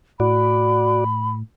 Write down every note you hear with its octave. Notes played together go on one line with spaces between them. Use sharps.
A2 F#4 D5 B5